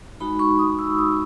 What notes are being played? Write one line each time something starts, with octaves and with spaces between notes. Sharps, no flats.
G#3 D#4 F#4 B5
C#6
D#6
E6
D#6